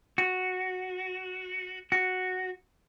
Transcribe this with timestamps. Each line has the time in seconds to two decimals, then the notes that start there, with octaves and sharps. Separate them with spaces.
0.18 F#4
1.92 F#4